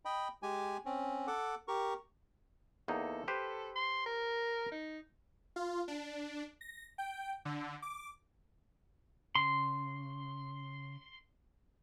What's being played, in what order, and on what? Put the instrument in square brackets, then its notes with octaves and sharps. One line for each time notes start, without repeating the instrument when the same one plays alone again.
[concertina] D#5 G5 B5
G#3 G4 G#5
C4 C#4
A4 F#5 D6
G4 A#4 C#6
[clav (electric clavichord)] E2 A#3 D#4 [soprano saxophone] A4
[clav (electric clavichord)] G4 B4 C5
[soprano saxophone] C6
A#4
D#4
[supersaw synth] F4
D4
A#6
G5
D3
D6
[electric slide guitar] C#3 [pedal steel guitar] C6